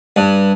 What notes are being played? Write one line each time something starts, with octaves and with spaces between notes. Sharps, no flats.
G2